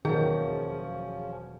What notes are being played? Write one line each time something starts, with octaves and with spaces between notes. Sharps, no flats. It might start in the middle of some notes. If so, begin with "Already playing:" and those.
E1 D#3 F3 F#3 C#4 G#4